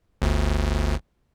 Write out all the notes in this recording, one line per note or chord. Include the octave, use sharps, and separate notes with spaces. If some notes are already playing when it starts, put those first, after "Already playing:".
G1 D2